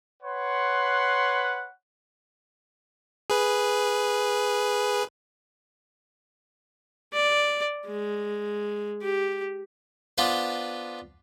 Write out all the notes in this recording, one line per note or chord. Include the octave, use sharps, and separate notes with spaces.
B4 C#5 F#5 C6
G#4 B4
D5
G#3
G4
B3 D4 F4 B4 C5